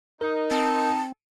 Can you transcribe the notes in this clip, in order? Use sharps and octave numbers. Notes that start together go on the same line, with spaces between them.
D#4 A#4
C4 A5